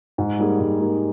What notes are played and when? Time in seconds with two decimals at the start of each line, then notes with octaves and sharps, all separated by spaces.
0.18 G#2
0.39 G3 A#3 D#4 G#4
0.60 G#2
0.80 G3 A#3 D#4 G#4